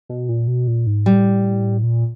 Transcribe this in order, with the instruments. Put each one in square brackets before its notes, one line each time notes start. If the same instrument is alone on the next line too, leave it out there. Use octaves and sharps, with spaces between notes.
[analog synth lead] B2
A#2
B2
A#2
G#2
[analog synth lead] A2 [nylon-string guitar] G3
[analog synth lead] A#2